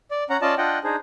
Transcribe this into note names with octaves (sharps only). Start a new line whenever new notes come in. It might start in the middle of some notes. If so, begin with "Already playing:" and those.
D5
C#4 F#5 A#5
C#4 F4 D5 D#5 A5
D4 F4 D#5 F#5 G5
D4 D#4 G#4 C5